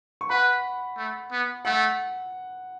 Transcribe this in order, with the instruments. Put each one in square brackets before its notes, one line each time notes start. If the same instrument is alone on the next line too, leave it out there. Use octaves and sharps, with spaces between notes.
[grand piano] C#6
[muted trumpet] B4 [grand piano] F#5 B5
[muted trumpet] A3
B3
[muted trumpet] A3 [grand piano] F#5